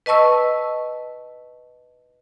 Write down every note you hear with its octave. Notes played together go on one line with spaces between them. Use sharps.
B4 D#5 A5 C#6 E6